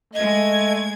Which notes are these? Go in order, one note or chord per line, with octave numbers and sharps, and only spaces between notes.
G#3 A3 D#5 G#6